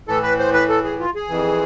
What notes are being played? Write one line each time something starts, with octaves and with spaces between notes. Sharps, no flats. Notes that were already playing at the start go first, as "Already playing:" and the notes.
A2 E3 A4
B4
C5
B4
A4
G#4
F4
G#4
F2 E3